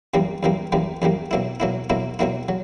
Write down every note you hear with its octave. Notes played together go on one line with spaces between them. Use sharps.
F#2 E3 G3 A#3
F#2 E3 G3 A#3
F#2 E3 G3 A#3
F#2 E3 G3 A#3
B2 F#3 A#3 E4
B2 F#3 A#3 E4
B2 F#3 A#3 E4
B2 F#3 A#3 E4
F#3